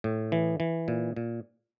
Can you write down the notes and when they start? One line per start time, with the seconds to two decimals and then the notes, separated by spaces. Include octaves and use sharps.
0.04 A2
0.32 E3
0.60 E3
0.88 A#2
1.16 A#2